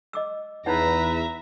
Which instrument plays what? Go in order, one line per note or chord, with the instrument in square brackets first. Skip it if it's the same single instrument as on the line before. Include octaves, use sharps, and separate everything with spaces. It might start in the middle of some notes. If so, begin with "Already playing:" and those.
[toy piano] D#5 D6 E6
[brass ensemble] E2 [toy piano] D#4 C#5 F#5 [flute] B4 [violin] E5 A#5